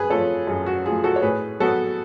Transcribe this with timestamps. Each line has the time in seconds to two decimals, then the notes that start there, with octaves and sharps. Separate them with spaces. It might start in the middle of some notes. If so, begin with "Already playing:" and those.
Already playing: F#2 G#4 B4
0.10 F3 A3 A4 C#5
0.47 F#2 G#4
0.66 F#4
0.85 F3 G#4
0.89 A3
1.04 F#4 A4
1.16 C#5
1.22 A2 G#4 B4
1.60 F#3 B3 F#4 A4